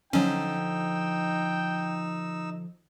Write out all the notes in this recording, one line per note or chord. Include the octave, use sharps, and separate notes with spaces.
D3 F3 F#3 C#4 D#4 G5 E6